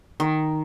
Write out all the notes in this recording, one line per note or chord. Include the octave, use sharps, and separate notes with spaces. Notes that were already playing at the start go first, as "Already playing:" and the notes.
D#3